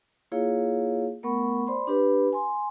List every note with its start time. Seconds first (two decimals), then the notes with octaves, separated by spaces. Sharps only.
0.32 A#3 E4 F4 G#4 C#5 F5
1.23 A3 B3 A#4 F#5 B5 C#6
1.67 C5 D5 B5 C6
1.87 D4 G4 B4 B5
2.33 G#5 C6